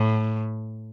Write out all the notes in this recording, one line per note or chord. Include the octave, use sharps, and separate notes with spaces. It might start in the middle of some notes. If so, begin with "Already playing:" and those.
Already playing: A2